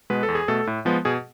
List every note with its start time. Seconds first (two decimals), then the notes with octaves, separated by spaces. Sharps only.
0.10 B2 G#3 B3 B4
0.23 A4
0.28 E2
0.35 G#4
0.48 B2 A3 A4
0.67 A2
0.85 F3 G#3 B3
1.05 B2 G#4